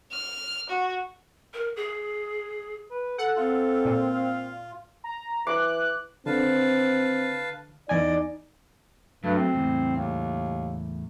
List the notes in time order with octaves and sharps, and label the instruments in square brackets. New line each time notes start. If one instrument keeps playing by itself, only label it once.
[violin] F6
F#4
[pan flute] A#4
G#4
[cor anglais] B4
[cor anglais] A4 [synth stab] F#5
[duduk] C4 [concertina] F4
[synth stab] A#2
[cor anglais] F5
[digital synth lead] A#5
[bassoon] E3 [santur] D6 [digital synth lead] F#6
[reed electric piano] D3 [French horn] C4 [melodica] B4 F5 A5
[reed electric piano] E2 G#5 [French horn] D#4 [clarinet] D5 [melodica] D#5
[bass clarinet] G2 [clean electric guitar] F#3 A3
[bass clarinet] C4
[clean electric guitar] E2 A2
[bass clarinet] D#2